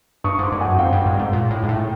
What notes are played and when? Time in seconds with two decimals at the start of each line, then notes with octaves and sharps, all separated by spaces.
0.24 G2 C#6 D#6
0.39 G#2 C6 D6
0.52 G2
0.61 F#5 G#5
0.65 F#2
0.78 F2 F5 G5
0.92 G2
1.06 G#2
1.13 G2
1.19 G#2
1.33 A#2
1.51 A2
1.63 G#2
1.69 A2
1.75 G5